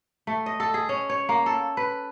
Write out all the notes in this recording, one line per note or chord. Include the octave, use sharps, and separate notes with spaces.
A3
D#5
A4
G#4
C#4
C#5
A#3
A4
B4